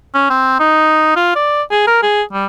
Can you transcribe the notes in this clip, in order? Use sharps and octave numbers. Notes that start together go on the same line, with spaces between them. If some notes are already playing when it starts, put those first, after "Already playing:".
C#4
C4
D#4
F4
D5
G#4
A#4
G#4
G3